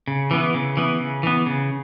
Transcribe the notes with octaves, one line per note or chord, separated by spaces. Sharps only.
C#3
E3 B3
C#3
E3 B3
C#3
E3 B3
C#3